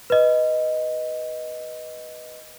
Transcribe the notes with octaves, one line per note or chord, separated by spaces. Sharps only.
B4 D#5